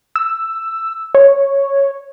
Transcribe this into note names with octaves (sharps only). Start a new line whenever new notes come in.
E6
C#5